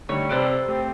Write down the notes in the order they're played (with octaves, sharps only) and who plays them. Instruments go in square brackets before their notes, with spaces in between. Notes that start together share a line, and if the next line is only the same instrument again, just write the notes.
[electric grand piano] D3 A3 D#4 [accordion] G3 [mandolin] C#5
[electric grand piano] C3 D5 D7 [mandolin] A4 B4 C5
[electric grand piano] A3 G4 [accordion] C4